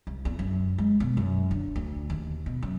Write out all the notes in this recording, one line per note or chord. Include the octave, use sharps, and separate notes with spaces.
C2
E2
F#2
G#3
B2
F#2
D3
D2
D#2
B2
F#2